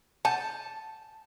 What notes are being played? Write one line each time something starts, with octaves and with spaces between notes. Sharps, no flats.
F#5 G#5 A5 G6